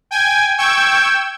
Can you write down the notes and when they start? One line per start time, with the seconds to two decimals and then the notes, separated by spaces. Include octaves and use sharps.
0.11 G5 G#5 G#6
0.58 G5 C#6 E6 G6 G#6